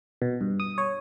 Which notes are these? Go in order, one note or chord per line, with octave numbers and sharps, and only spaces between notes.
B2
G2
D#6
C#5